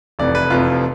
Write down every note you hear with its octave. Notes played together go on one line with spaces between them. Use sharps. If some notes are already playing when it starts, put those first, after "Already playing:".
F1 F2 C3 E3 D5
B4
F1 F2 C3 E3 F4